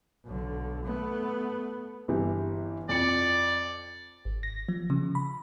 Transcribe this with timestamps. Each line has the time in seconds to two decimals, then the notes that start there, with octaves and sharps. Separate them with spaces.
0.25 B1 D3
0.84 A3 B3
2.08 G1 E3 G4
2.89 F2 D5 C#7
4.25 G#1
4.43 A#6
4.69 F3
4.90 C#3
5.15 B5